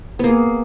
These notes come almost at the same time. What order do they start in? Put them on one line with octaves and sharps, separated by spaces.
B3 A#3 G#4